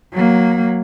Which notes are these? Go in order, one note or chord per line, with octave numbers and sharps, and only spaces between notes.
F#3 A#3